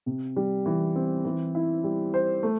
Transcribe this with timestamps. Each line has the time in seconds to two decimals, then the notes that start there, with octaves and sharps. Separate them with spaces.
0.06 C3
0.36 G3
0.66 E3
0.96 C4
1.25 E3
1.55 E4
1.84 G3
2.14 C5
2.43 A3